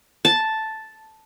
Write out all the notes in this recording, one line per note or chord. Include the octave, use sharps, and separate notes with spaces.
A5